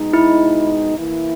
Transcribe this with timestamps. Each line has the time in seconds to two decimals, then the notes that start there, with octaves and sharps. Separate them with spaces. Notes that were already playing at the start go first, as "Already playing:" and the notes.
Already playing: B2 G#3 D#4
0.13 E4
0.97 E3 A#3 E4